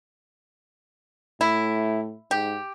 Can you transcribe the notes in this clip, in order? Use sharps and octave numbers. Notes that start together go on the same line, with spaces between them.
A2 E4
G#2 G4